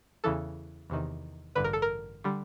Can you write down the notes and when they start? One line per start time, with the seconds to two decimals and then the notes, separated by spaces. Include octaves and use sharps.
0.24 E2 C#3 E3 A4
0.90 E2 C3 D#3
1.55 A1 G2 D3 B4
1.64 A#4
1.73 A4
1.82 A#4
2.24 D3 G3